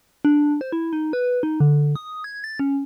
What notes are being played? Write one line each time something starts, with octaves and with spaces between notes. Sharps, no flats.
D4
C5
E4
D#4
B4
D#4
D3
D#6
G#6
A6
C#4